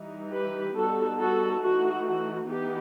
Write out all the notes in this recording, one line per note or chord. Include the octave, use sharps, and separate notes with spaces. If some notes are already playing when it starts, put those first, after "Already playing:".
Already playing: E3 G3 D#4
G4 B4
G3 B3 D#4 F#4 A4
F#4 A4
E3 A3 D#4 F#4
F#4
E3 B3 D#4 G4